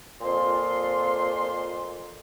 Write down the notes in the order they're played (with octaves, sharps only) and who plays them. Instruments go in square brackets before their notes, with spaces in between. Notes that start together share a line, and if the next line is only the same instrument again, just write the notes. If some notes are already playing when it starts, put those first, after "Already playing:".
[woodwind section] F2 A#2 F4 C6